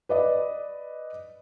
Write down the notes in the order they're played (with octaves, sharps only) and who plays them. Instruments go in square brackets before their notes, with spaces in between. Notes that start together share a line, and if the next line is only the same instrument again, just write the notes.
[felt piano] B4 D5 D#5